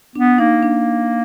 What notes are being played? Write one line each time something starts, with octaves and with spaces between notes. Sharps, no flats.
B3 D4
A#3 D#4
D4